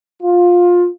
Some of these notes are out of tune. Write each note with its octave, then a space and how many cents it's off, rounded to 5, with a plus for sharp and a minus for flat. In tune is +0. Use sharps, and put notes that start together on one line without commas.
F4 +15